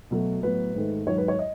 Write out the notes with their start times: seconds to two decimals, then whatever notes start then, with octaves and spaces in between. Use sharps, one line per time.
0.11 B2 F#3 A3
0.43 A2 F#3 B3 B4
0.75 G#2 D#3 A3
1.07 G#2 D#3 F#3 C#5
1.18 B4
1.28 C#5
1.39 D#5